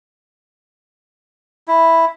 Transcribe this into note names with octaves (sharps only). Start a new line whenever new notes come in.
E4